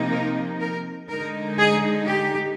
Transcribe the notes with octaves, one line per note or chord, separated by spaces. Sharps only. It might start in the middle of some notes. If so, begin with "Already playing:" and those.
Already playing: C3 F3 A#3 D#4
A#4
A#4
D3 G#3 D#4 A#4
G#4
G4